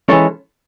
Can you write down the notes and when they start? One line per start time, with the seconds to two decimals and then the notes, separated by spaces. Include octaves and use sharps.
0.09 E3 G#3 C#4 A4 C#5